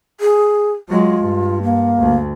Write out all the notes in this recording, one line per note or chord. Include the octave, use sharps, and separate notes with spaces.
G#4
F#3 G#3 F4
G2
A#3
D2